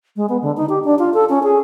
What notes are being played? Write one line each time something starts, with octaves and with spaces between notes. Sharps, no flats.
G#3
B3
D3
D#4
G4
D4
F4
A4
C#4
G#4